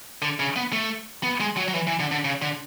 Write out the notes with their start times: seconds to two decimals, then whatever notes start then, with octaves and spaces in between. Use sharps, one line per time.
0.22 D3
0.40 C#3
0.56 B3
0.73 A3
1.23 B3
1.40 G#3
1.57 F#3
1.68 F#3
1.74 E3
1.87 E3
2.00 D3
2.12 D3
2.25 C#3
2.42 D3